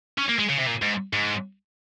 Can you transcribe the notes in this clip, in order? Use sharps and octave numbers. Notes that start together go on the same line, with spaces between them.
C#4
A#3
G#3
C#3
C3
A#2
G#2
G#2